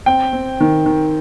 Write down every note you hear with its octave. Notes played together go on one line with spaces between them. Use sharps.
C4 G5
C4
D#3
D#3